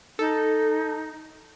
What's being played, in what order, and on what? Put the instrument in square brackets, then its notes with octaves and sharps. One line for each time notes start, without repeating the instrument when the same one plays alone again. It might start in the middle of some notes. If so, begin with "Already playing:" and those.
[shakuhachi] D#4 [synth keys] A4